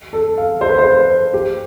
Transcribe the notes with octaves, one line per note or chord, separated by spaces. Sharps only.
A4
F5
C5
B4
C5
G4